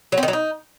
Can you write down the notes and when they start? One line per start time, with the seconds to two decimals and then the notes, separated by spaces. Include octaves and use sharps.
0.12 F#3
0.17 C4
0.23 D#3
0.28 F#3
0.33 D#4